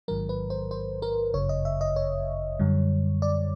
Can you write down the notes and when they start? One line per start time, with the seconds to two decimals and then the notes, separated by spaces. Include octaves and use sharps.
0.08 A1 G#2 D#3 F#3 A#4
0.29 B4
0.50 C5
0.71 C5
1.02 A#4
1.34 G1 F#2 C#3 C#5
1.49 D#5
1.65 E5
1.81 D#5
1.96 C#5
2.59 F#2 D3 G3
3.22 D5